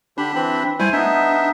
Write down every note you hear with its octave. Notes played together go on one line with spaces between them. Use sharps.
D3 D4 G4 B5
E3 C4 B5
G3 A3 E4 C5 G#5
B3 D4 D#4 E5